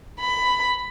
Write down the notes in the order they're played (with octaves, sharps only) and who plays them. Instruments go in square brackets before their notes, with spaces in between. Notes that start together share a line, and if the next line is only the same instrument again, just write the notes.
[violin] B5